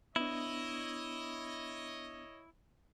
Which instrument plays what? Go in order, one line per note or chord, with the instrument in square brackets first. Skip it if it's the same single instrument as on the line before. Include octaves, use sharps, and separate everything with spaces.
[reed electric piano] B3 D4 [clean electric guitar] E4 [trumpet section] C#5 D#5